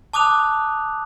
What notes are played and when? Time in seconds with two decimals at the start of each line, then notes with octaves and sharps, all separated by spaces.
0.13 A5 D6 D#6 F#6 F7